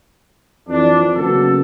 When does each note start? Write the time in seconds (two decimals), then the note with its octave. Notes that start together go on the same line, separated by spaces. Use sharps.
0.69 F2 E3 D4
1.16 C#3 F#3 A#3 B3 A4